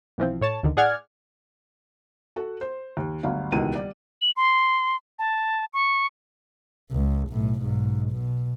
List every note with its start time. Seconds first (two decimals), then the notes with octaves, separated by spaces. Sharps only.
0.18 B1 E3 F3 C4
0.41 A2 C#5 A5
0.63 D2 D3 D#3
0.77 A2 G#4 D5 F#5 F6 G#6
2.36 F#4 A4 F#5
2.61 C5
2.97 D#2
3.23 G1 D2 F#3 F5
3.52 D#1 C#2 B2 D#3 E3 D#7
3.75 G3 D5
4.22 F#7
4.37 C6
5.19 A5
5.74 C#6
6.91 C#2
7.29 B1 A2
7.62 B1 G#2
8.12 B2